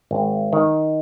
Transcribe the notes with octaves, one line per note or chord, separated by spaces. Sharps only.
G#1
D#3